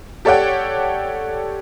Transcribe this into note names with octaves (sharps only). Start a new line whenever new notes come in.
G4 A4 C#5 D5 F#5 G5